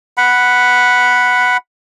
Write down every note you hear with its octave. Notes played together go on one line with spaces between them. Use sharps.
F#5 B5